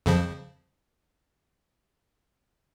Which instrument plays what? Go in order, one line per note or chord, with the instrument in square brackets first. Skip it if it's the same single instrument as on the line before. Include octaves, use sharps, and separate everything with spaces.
[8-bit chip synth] F2 C#3 F3